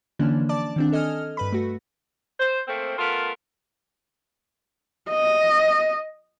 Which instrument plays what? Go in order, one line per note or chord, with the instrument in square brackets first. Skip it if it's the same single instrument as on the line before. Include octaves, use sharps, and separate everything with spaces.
[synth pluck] D3 E3 F3 A#3 C#4 D4
D5 A5 D6
D#3 C4 D4
A4 D#5 G#5 F6
G2 B4 B5
A3 F#4
[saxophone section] C5
A3 A#3 C4
A3 B3 F4 A4 A#4
[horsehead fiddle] D#5